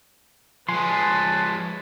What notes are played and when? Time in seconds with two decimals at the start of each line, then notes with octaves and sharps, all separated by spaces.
0.69 F3 G#3 B4 C#5 G#5 A5 C6